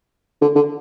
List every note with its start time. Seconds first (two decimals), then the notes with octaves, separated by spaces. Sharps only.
0.41 D3
0.55 D3